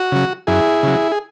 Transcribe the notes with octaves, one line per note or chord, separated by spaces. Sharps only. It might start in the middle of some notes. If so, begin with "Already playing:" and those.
Already playing: F#4
C#3 F#3
F#2 E4 G#4
C#3 F#3
G#4